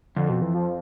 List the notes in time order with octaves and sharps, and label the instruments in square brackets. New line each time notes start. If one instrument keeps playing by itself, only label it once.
[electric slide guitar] F2 [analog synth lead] D3
[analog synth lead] B2
E3
F3